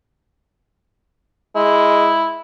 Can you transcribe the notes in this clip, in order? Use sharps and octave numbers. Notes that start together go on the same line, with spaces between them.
G#3 E4